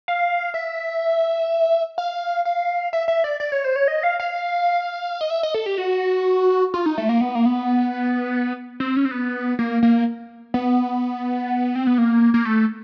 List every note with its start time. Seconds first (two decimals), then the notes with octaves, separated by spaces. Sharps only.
0.08 F5
0.54 E5
1.98 F5
2.45 F5
2.93 E5
3.08 E5
3.24 D5
3.40 D5
3.52 C#5
3.65 C5
3.76 C#5
3.88 D#5
4.03 F5
4.20 F5
5.21 D#5
5.30 E5
5.43 D#5
5.54 A4
5.66 G4
5.78 F#4
6.74 F4
6.86 D#4
6.98 A3
7.09 A#3
7.21 B3
7.35 A#3
7.46 B3
8.80 C4
8.96 C#4
9.05 C4
9.11 B3
9.59 A#3
9.83 A#3
10.54 B3
11.75 C4
11.87 B3
11.98 A#3
12.34 A#3
12.45 A3